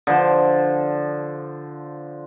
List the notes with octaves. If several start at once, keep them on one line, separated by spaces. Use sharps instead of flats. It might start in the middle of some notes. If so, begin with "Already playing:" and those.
D3 F3 C5